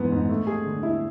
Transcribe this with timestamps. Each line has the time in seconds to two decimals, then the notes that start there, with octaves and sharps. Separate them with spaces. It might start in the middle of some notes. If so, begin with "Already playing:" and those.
Already playing: G#2 E3 B3
0.12 G#2
0.29 A3
0.47 G#4
0.66 D3
0.83 E4